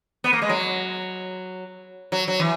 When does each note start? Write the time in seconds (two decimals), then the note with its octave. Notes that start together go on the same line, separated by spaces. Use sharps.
0.24 B3
0.33 A#3
0.42 G#3
0.49 F#3
2.12 F#3
2.28 F#3
2.40 E3